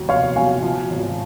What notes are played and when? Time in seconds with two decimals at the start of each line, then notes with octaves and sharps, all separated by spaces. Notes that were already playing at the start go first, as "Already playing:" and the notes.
Already playing: D#2 F#3
0.09 F1 C#5 F5
0.36 F#3 F5 G#5
0.63 F3
0.90 G#1